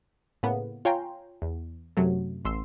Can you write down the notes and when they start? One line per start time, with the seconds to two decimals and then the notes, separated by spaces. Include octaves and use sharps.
0.43 A2 C#3 A#3 B3
0.85 F4 C#5 G5 G#5 A#5 C6
1.42 E2
1.97 F#2 C3 F#3 A3
2.45 A1 C6 E6 C7